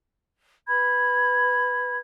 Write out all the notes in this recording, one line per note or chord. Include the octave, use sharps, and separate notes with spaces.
B4 B5 G#6